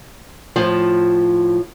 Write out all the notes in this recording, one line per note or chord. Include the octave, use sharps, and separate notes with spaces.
A2 F3